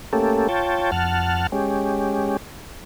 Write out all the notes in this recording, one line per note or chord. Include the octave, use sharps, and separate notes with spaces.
A3 A#3 C#4 G4 A4
F4 C#5 G5 A5
F2 F#5 A5 F6
G#3 C#4 G4